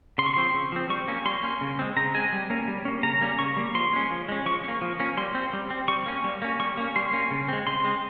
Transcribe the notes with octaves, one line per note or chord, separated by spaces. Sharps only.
C#3 C6
C#6
F3 C4 C6
C#3
F3 C4
G3 C#6
A#3 C#4
G3 C6
A#3 C#4
C#3
G#3 C4
C#3 A#5
G#3 C4 G#5
G3
A#3 C#4
G3
A#3 C#4
C#3 A#5
G3 A#3 C#4
C#3 C#6
G3 A#3
F3 C6
G#3 C#4
F3
G#3 C#4
F3 C#6
C#4
A#3
F3
A#3 C#4
G3 C6
C4
G3
C4
G3 C#6
A#3 C#4
G3
A#3 C#4
G3 C#6
A#3 C#4
G3 C6
A#3 C#4
C#3
G#3 C4
C#3 C6
G#3 C4